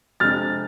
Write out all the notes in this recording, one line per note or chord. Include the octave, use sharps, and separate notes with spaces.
F2 C3 G#3 D4 F6 A6